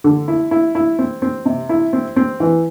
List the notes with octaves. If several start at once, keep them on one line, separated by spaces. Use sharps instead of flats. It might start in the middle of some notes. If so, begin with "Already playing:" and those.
D3
E4
E4
E4
C4
C4
C3
E4
C4
C4
E3